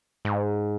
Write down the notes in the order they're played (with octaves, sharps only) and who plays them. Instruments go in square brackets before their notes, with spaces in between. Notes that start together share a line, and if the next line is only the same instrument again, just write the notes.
[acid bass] G#2